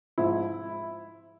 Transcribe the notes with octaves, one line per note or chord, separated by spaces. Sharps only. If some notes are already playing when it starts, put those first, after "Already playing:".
G#2 F3 E4